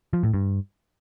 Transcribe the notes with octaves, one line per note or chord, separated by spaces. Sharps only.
F3
A2
G2